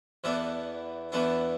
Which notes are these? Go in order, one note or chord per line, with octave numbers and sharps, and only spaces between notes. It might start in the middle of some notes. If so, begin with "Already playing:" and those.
E2 E3 B3 D4 A4
E2 E3 B3 D4 A4